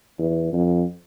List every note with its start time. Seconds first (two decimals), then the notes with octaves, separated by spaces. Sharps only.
0.19 E2
0.53 F2